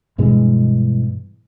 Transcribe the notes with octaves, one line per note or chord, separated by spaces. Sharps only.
G2 B2 E3 G#3